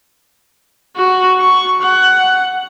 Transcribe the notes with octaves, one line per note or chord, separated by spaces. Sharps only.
F#4
C#6
F#5